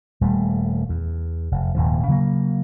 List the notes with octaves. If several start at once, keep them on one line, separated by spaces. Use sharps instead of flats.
D#1 G3 A3
E2
F1
D#1 D#2 G#2 F3
C#3 F#3 G#3 A#3